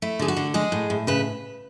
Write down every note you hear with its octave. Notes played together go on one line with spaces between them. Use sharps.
A3 E4
D3 G#4
F#4
D3
G#3 G#4
A2
A2
C#3 B4